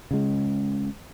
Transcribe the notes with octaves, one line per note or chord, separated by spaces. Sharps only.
C#3 G#3